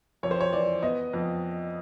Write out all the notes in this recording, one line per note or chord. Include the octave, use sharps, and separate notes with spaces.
F2 C#5
C5
C#5
E3 D5
B3 D#5
F2